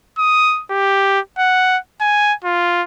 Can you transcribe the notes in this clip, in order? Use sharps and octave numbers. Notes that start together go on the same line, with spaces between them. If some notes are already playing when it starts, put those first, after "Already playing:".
D#6
G4
F#5
G#5
F4